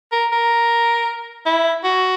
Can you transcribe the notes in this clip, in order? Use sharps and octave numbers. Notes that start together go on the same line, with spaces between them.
A#4
A#4
E4
F#4